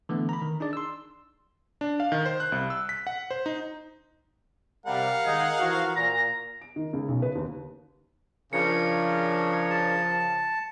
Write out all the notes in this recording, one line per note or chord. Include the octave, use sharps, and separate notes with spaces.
D3 E3 A3 B3
A#5 B5
D#3
D4 D#4 G#4 D5
C6 E6
D4
F5
D#3
C5
F#6
C2
E6
B6
F#5
C5
D#4
C3 G3 A#4 F5 F#5
D#3 G#3 D#4 G#4
E3 F3 F#4
A#2 A#5
D7
D#3
C#2
B1
B4
D#2
C#3 F3 D4 A#4 C#5 C#7
A5